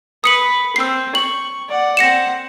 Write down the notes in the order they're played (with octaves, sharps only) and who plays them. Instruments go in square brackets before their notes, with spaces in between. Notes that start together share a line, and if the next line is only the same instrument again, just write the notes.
[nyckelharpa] B4 [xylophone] D#6 C#7 F#7
[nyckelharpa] C4 [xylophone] E6 C7
[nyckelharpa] C#6 [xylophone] F#7
[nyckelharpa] D5 F#5
[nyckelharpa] C4 F#5 [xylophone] A#6 C#7 E7